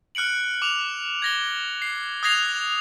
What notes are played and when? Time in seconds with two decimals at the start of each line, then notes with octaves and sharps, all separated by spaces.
0.15 F6 F#6 C#7 D7 F#7
0.62 D6 F7
1.22 G#6 A#6 G7
1.82 C7
2.23 D#6 F#6 G#6 A#6 C7 F7